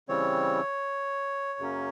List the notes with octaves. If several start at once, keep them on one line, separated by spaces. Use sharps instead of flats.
C#3 E3 G3 C4 C#5
F#2 C#3 F#3 A#3 C#4